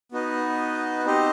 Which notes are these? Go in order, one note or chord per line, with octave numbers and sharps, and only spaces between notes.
B3 D#4 F#4 B4 D#5
C4 D#4 G4 C5 D#5